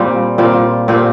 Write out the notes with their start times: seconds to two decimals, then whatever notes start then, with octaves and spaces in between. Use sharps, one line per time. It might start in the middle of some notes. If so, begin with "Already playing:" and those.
Already playing: A#2 G3 C4 F4
0.38 A#2 G3 C4 F4
0.88 A#2 G3 C4 F4